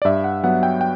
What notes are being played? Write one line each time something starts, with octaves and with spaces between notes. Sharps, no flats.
D5
G2 E5
F#5
F#3 B3 F#5
G5
G5